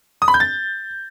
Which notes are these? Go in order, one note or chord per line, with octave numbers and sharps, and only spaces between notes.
D#6
B5
G6
A6